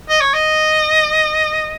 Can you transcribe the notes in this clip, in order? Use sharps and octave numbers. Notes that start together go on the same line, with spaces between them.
D#5
C#5
D#5